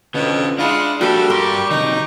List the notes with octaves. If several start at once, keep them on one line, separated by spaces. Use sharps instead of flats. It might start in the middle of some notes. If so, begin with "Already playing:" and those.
F2 B2 D3 C#4
G#3 D4 E4 F4 F#5
G3 A#3 D4 F#4 A4 B4
G2 G4 A#4 C6 C#6
C3 D#3 D#4